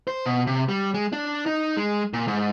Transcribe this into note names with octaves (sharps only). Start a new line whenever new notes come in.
C5
B2
C3
G3
G#3
D4
D#4
G#3
A#2
G#2